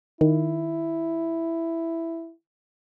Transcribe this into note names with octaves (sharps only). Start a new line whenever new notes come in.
D#3 E4